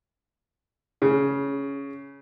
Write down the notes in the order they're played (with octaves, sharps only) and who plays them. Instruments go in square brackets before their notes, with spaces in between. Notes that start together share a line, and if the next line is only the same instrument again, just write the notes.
[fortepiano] C#3